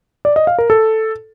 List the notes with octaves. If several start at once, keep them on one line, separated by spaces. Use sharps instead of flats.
D5
D#5
F5
A#4
A4